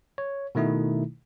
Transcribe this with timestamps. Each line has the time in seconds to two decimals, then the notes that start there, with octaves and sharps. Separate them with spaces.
0.18 C#5
0.55 B2 D#3 A3 D#4 E4